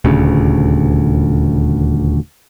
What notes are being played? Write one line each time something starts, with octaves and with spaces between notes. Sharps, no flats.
D#1 D2 C#3